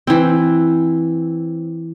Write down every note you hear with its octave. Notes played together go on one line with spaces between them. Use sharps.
E3 C4